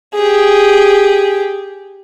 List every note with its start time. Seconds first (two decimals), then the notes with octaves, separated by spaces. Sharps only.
0.15 G4 G#4